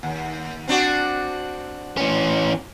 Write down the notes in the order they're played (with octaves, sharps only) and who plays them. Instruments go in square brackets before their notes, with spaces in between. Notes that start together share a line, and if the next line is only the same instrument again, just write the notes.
[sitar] D#2
C4 D4 F#4
[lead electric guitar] E3 C#4